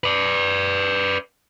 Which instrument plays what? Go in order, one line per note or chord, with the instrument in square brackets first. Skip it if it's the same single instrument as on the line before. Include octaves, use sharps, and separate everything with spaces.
[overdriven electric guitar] B4 D5